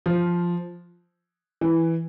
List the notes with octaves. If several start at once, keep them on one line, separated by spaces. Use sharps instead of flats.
F3
E3